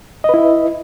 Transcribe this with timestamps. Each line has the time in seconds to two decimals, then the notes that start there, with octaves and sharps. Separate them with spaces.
0.24 D#5
0.29 B4
0.34 E4
0.38 E5